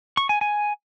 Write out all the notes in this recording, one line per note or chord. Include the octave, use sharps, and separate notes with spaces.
C#6
G#5
G#5